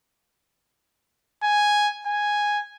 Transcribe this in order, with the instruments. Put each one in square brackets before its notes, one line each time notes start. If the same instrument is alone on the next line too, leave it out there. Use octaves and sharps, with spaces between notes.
[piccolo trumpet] G#5
G#5